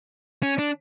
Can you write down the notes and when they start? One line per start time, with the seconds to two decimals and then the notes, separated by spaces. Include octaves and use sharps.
0.43 C#4
0.59 D4